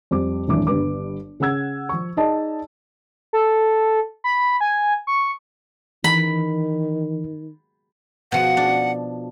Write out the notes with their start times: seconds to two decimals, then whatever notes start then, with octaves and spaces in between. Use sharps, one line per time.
0.11 F2 G3 D6
0.48 D#1 G#1 E3 F#3 D4 D6
0.67 G1 G2 B4 D6
1.40 C#3 G#4 F#5 E6 G#6
1.89 F3 C#6
2.17 D#4 G#4 D5 D#5 A5
3.33 A4
4.24 B5
4.61 G#5
5.07 C#6
6.04 D#3 E3 B5
8.32 B2 F3 F#5
8.57 D4